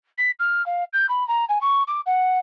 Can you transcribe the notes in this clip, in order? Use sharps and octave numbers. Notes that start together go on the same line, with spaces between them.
B6
F6
F5
G6
B5
A#5
G#5
C#6
D6
F#5